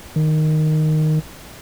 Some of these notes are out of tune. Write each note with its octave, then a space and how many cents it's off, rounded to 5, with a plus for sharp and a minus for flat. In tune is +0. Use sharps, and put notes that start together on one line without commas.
D#3 -5